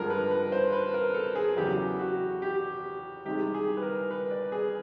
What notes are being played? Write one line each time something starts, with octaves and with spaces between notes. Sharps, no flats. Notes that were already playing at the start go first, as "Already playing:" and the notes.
Already playing: G2 D3 F3 G#3 A#4
B4
B4
C5
B4
A#4
A4
G#4
E2 C#3 F#3 G4
F#4
G4
C2 C3 D#3 G#3 G4
G#4
B4
A#4
B4
D5
G#4